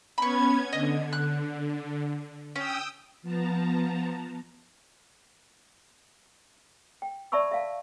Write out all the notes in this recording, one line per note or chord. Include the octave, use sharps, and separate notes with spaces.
B3 C#4 B5 C#6 G#6
D3 D#5
F#6
C#4 G5 D#6 E6
F3 B3 A5 A#5
G5
D5 E5 A5 B5 C#6 E6
E5 F5 A5